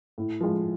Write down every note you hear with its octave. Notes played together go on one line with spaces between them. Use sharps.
A2
F3 G#3